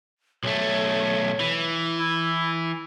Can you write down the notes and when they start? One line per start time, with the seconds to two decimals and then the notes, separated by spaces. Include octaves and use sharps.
0.43 B1 A3 C#5
1.40 E3
1.97 E4